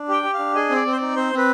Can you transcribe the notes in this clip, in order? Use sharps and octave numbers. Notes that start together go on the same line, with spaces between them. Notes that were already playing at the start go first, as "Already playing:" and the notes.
Already playing: D4
G4 G5
G4
F5
D4
G#4 D#5
C4
D5
C4
C5
D5
D#4
C4 C5
C4 B4